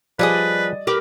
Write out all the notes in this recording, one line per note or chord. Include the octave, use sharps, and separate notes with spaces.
F3 G3 G#4 B4 D5 D#5 D#6
G4 A#4 B4 D6